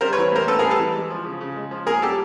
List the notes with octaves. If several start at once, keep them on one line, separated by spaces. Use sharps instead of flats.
G3 A#4 C5
B4 C#5
E3
A2 A#4 C5
A2 A4 B4
G#4 A#4
G3
A4 B4
E3
G#3
F3
C#3
C#3
G#3
F3
A#3 G#4 A#4
G3 G4 A4